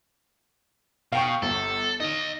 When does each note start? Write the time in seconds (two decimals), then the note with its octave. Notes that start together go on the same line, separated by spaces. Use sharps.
1.13 B2 F5 G5 C#6
1.42 G1 A4
2.00 D#4 D#5 F5